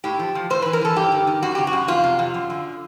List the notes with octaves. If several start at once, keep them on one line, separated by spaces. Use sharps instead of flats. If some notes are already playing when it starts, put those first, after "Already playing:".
A2 G4
F3
F3
A2 C5
E3 B4
A#4
E3 A4
G2 G4
D#3
D#3
F#2 F#4
C#3 G4
F#4
F#2
F2 F4
C3
F2
F#2
D3